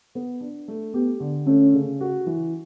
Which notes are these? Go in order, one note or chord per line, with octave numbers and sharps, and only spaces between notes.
B3
D4
A3
B3 G4
D3
A3 C#4
C#3
F#4
E3